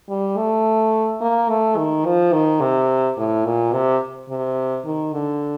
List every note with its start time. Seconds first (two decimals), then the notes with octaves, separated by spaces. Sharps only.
0.09 G3
0.37 A3
1.21 A#3
1.49 A3
1.77 D#3
2.05 F3
2.33 D#3
2.61 C3
3.18 A2
3.45 A#2
3.73 C3
4.29 C3
4.85 D#3
5.13 D3